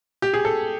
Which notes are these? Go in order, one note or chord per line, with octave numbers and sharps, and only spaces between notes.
G4
G#4
A4